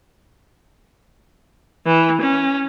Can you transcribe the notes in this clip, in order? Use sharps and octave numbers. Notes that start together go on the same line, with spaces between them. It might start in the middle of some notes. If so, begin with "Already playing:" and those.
E3
C#4